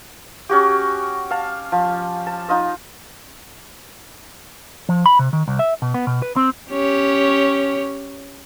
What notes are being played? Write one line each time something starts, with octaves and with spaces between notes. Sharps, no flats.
C#4 F#4 G4
F5 A5
F3
A5
D#4 F4 D#5
F3
B5
C3
D#3
C2
E5
B2
B3
B2
B4
C4
C#4 G4 C#5